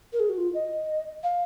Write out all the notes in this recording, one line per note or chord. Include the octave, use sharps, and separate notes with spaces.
A#4
G#4
F#4
F4
D#5
F5